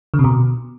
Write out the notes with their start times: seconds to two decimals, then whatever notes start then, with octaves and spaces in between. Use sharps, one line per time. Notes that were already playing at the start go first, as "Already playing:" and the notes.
0.14 D3
0.19 C3
0.24 B2